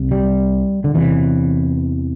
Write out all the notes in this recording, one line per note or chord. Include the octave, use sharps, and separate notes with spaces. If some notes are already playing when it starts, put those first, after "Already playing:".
Already playing: C2 C3
G3
D3
E2 C3 E3